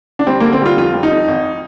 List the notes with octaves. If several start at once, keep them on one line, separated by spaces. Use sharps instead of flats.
D4
G3 C4
A#3
D3
C4
G3 F4
F2 F4
G3
D#4
F2
G#1